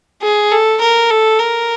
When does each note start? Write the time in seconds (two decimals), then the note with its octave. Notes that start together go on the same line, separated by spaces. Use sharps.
0.22 G#4
0.52 A4
0.81 A#4
1.10 A4
1.39 A#4